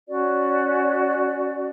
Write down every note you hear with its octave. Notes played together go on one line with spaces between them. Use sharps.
C#4 F#4 D5